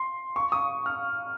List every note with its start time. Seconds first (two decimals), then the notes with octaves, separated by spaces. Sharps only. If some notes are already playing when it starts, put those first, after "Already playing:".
Already playing: C6
0.36 C#6
0.52 D#6
0.86 F6